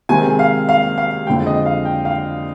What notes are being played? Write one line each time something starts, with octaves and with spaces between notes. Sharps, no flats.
C3 D#3 G#3 C4 G#5
F5
F5
F5
F2 D3 G#3 G5
D#5
F5
G5
F5